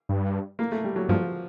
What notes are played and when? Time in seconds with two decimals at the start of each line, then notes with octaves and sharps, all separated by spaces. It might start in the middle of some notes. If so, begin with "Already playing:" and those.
0.09 G2
0.59 A#3
0.72 A3
0.84 G3
0.96 F#3
1.09 G2 F3